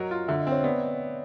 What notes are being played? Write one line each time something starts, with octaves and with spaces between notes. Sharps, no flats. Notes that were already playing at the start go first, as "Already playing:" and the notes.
Already playing: F#3 A#4 D#5
F4
D3 E5
D#5
C4
C#5
B3 D5